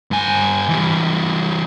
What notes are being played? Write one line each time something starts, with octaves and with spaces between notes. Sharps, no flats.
G2 G#5
E3 G3